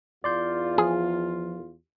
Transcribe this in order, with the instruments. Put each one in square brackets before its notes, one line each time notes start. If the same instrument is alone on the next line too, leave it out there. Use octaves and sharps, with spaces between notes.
[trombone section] E2 F4 [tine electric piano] D5 C6 G6
[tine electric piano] F3 [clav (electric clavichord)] G#4